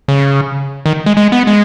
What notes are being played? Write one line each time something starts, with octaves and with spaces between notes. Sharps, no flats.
C#3
D#3
G#3
G#3
B3
G#3